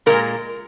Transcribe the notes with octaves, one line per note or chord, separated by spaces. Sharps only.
A#2 G#3 A#4